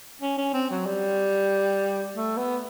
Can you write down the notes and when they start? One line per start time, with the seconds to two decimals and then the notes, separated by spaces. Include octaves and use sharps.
0.22 C#4
0.38 C#4
0.54 C4
0.70 F#3
0.86 G3
2.16 A3
2.37 B3